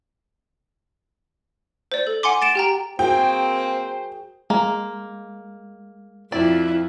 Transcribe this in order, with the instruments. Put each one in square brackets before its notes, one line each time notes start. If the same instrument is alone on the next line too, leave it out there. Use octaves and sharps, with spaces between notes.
[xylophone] C5 D5
A4
F#5 G#5 C6 D6
A6 D7 E7
G4 G5 A#5
[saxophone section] A#3 C4 [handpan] F#4 G#4 A#4 [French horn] C5 [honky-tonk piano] G5
[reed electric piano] G#3 [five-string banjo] A#3
[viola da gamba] F2 [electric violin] E4 [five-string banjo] D5